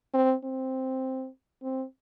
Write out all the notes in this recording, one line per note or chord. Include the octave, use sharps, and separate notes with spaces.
C4
C4
C4